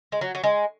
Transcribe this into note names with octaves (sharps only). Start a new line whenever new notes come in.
G#3
F#3
F#3
G#3